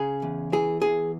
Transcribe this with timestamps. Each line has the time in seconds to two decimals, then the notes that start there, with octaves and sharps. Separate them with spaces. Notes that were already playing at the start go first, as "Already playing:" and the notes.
Already playing: C#3 G#4
0.22 E2
0.52 E3 G#4
0.81 E2 G#4